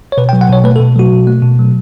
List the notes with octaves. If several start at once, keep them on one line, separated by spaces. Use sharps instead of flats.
C#5
B2 B4
G5
F#3
F#5
B2 C#5
A3 B4
A4
B2
F#3 F#4
B2
A3
B2
F#3